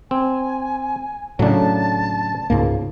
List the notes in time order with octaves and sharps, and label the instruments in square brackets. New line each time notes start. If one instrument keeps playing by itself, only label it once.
[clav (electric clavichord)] C4 [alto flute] G#5
[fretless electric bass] A2 C#3 [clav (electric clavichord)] F#3 D4 [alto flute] A5
[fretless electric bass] C#2 G#2 A#3